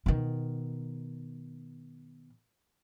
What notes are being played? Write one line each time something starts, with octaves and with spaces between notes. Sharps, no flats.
B2 D#3